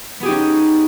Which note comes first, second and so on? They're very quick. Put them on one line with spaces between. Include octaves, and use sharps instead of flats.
B3 G#4 G4 D#4 C#4